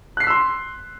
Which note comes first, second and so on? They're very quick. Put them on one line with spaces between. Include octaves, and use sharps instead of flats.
F#6 C7 B6 E6 C6